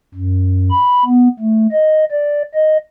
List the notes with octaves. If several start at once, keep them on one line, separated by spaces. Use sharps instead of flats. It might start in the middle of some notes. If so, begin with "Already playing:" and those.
F#2
B5
B3
A3
D#5
D5
D#5